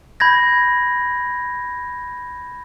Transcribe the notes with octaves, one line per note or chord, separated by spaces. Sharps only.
B5 G6 G#6 A#6